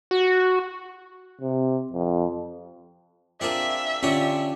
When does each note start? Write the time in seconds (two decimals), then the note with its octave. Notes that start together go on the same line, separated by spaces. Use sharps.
0.11 F#4
1.41 C3
1.92 F2
3.41 C4 D4 F4 G#4 A#4 E5
4.03 D3 C#4 D4 F4 G4 C#5